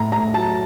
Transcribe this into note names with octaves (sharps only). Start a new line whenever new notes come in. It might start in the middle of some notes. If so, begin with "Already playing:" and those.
Already playing: A2 A3 A#5
A2 A#5
F#3 A5